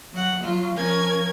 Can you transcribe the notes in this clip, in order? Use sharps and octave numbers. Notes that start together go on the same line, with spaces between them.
F#3 F#5
F#3 F4
F3 C#4 A#4 G#5 G#6